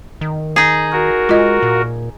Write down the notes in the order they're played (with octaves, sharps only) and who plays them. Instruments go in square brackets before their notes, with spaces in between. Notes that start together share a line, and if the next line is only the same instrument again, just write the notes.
[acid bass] D#3
[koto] D#4 G#4
[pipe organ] F#4 A#4
[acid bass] G#3 [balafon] F4 D#5
[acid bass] A#2